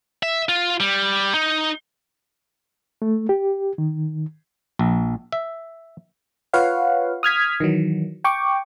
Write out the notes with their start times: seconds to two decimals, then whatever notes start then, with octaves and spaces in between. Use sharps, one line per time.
0.23 E5
0.49 F4
0.80 G3
1.34 D#4
3.02 A3
3.29 G4
3.78 D#3
4.79 A#1
5.32 E5
6.53 F4 B4 C#5 F5 F#5
7.23 D#6 F6 G#6 B6
7.60 D#3 E3 F#3
8.24 G5 C#6 D6